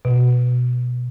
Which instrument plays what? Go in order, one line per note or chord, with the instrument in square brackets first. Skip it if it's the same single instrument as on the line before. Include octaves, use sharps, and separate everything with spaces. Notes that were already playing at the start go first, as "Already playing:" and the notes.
[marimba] B2